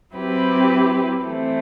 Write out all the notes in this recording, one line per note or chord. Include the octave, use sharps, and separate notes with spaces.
F#3 C4 E4 G4 B4
E3 A3 C4